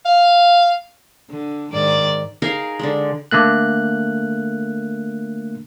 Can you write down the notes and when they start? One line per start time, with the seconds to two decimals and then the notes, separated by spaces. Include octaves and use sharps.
0.06 F5
1.30 D3
1.73 G#2 D#3 D5
2.42 D#4 G#4 A#4 F5
2.79 D3 G#3
3.31 D3 A3 A#3 F#6